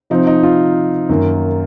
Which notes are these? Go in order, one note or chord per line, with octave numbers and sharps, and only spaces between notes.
C3 F3 C4 D#4
D#4
F4
F#2 D#3 A#3